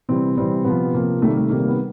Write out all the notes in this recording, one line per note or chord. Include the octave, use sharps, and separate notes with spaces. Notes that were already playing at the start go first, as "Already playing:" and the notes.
C3 E3 G3 C4
C3 E3 G3 C4
C3 F3 B3
C3 F3 A#3
C3 D#3 G3 A3
A#3
A3
C3 D#3 G3 A#3
A#3
B3